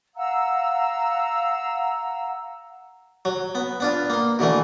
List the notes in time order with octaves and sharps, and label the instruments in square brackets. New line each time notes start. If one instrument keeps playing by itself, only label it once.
[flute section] F5 F#5 A#5 E6
[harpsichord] F#3
B3
B3 D4 F4
A#3 C6
B2 D3 E3 A3